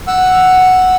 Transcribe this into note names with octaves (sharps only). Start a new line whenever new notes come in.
F#5 E6